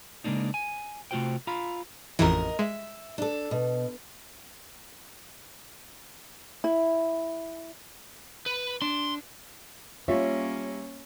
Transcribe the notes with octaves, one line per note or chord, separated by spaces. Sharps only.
C#3 G#3 A#3 D4 D#4
G#5
C3 A3 F4 F#4 C5 G5
F4 F5 A#5 B5
A1 F2 E3 A#4 D#5
G#3 E5
D4 A4
B2
E4
B4
D4 C6
G3 A#3 C#4 F4 C#5 E5